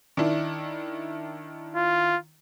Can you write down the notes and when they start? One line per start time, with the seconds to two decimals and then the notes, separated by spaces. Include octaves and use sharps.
0.17 D#3 D4 E4
1.76 F4